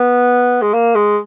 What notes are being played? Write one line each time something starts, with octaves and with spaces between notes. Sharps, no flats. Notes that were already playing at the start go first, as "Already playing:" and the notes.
Already playing: B3
G#3
A#3
G#3